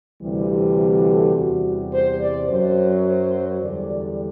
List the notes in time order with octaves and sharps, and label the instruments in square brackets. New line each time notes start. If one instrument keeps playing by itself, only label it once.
[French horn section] D2 C3 E3 G3
A4
E2 C3 G3 F#4
C5
D5
F#2 F#3 C5
C5
E2 D3 G3 D5